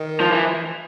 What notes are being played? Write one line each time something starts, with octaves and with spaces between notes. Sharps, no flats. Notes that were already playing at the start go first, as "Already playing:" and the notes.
Already playing: D#3
F3
E3